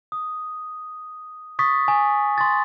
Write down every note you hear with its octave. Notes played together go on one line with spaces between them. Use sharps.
D#6
C#6 D#6 A6 B6
G#5
C6 A6